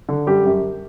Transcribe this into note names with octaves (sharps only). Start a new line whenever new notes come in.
D3
F#2 G3 G4
F#2